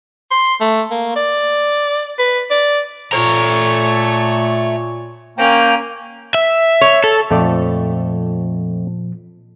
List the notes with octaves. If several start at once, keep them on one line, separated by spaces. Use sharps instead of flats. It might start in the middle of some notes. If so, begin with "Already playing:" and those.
C6
A3
A#3
D5
B4
D5
A#2 A3 A4 C#5 A#5
A#3 C#4 G5 A#5
E5
C#5
A4
F2 A#2 F3 A3 D5